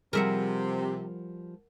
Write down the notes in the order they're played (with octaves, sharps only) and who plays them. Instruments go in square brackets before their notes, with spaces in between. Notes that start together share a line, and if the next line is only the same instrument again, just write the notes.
[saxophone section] C3 [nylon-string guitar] F3 G3 G#4 [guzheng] A#4 E5 F#5